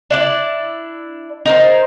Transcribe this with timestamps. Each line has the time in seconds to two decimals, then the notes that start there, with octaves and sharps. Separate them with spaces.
0.10 D4 E4 D5
1.46 D#4 A#4 C5